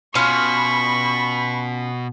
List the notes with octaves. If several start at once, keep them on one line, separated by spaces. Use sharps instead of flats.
B2 C#4 F4 B5 C#6